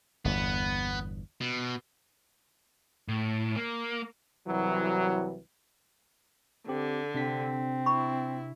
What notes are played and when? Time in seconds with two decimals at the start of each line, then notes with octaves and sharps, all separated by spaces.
0.25 G1 E2 B3
1.41 B2
3.08 A2
3.56 A#3
4.47 C2 E3 F#3
6.68 D3 C4 G4
7.14 C3 C4 D4 B6
7.86 E4 B5 C#6